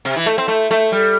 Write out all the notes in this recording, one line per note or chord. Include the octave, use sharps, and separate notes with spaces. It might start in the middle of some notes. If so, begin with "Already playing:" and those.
C3
E3
A3
C4
A3
A3
G3